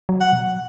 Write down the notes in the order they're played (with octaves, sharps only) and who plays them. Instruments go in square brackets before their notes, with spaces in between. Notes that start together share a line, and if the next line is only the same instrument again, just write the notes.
[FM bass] F#3
[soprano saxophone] F#5
[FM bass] B2